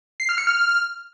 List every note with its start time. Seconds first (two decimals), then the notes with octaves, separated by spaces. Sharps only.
0.20 C7
0.29 F6
0.38 C#7
0.47 F6